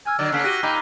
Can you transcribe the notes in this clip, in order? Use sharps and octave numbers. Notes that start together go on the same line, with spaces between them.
G#5 E6 F6 G#6
D3 F#3 D5
C#3 A#3 C#4 F#6 B6 C7
F#4 G4 A#6 D#7 G7
A#2 D#4 G5 A#5 B5 D6